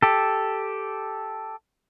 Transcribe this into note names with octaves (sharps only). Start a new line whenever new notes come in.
G4 A4